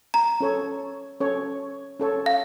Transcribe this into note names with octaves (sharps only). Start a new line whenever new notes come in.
A#5
C#4 A4 C#5
C#4 A4 C#5
C#4 A4 C#5
F5